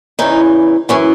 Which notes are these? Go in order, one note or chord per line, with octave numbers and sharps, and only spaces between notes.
E2 C#3 E3 D#4
F#2 E3 C#4